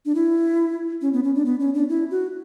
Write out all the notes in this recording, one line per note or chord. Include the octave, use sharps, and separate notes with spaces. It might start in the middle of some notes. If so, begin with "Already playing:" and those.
D4
E4
C#4
B3
C#4
D4
B3
C#4
D4
E4
F#4